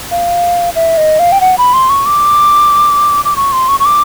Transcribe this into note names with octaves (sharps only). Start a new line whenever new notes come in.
F5
E5
D#5
F5
G5
F#5
B5
C6
C#6
D6
D6
C#6
C6
C#6
C#6
D6